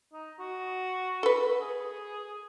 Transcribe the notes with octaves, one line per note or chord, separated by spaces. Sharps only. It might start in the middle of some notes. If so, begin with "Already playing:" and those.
D#4
F#4
A4 B4
G#4